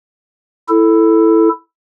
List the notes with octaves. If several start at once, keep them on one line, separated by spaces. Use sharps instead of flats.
E4 A4